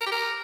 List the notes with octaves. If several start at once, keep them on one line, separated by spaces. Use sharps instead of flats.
A#4
G4
A#4